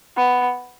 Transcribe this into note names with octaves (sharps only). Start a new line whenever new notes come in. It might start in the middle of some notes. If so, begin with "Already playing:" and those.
B3